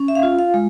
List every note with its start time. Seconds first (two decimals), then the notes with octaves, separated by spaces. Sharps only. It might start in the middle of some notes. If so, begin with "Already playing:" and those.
Already playing: C#4
0.08 E5
0.15 F5
0.23 F4
0.39 F5
0.54 G#3